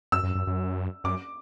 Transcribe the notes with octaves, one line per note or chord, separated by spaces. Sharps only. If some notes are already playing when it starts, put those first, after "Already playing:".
F#2 E6
F#2
F#2
F#2
F#2 D6